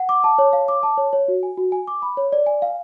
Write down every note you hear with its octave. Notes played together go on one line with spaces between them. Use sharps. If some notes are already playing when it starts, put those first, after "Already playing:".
Already playing: F#5
D6
A5
C#5
F5
D6
A5
C#5
C#5
F#4
G#5
F#4
G#5
D6
B5
C#5
D5
G#5
F5